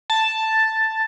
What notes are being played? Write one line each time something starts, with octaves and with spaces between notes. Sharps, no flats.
A5